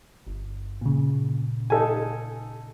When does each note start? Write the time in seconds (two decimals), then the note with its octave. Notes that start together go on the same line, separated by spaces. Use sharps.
0.27 G1
0.81 A#2 C#3
1.70 D#4 A4 G#5